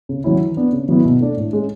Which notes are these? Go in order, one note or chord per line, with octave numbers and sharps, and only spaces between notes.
C#3
F#3 C#4 E4
E3
B3 D4
C#3
F#3 B3 E4
B2
A3 D4
A2
G#3 C#4